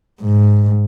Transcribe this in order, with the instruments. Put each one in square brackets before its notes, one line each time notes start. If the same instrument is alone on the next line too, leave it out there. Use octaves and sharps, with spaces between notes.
[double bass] G#2